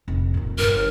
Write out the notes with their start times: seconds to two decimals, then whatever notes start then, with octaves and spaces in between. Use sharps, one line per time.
0.08 F1 A#2
0.34 F2 A#2
0.58 G1 A#4